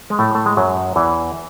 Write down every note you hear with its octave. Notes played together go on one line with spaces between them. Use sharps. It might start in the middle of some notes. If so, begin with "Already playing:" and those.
G#3
A2 A3
A3
G#3
F#2 F#3
E2 E3